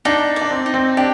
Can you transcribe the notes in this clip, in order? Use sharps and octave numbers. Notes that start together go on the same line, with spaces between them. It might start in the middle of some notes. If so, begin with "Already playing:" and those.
D4 D#4
D5
D4
C4
D#4
C4
D4 G4